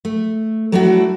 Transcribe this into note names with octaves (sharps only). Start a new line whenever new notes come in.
A3
F#3 G3 A3 D4 E4 F#4